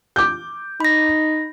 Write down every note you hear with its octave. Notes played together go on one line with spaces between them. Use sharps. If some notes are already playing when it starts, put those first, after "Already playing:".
D6 G6
D#4 B5 A#6